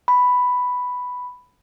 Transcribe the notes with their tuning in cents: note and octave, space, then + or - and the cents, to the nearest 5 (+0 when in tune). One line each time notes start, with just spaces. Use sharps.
B5 +5